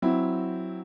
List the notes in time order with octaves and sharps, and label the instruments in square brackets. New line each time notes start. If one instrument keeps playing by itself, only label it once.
[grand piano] F#3 C4 E4